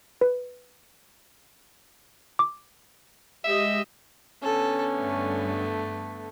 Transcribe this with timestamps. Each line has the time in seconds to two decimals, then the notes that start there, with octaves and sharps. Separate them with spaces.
0.21 B4
2.39 D6
3.44 G#3 G4 D#5 E5
4.43 D3 B3 C#4 A4
4.98 G2 A3